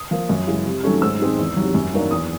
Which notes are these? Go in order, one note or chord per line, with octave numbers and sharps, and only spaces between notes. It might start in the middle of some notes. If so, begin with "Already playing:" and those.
Already playing: D#6
F3 A#3
F#2
C#3 E3 G#3
C3
D#3 F#3 A3 C#4
G#2 E6
D#3 G#3 C4
E2
C3 D#3 F#3
F#2
D#3 F#3 A#3 D4
E2 D#6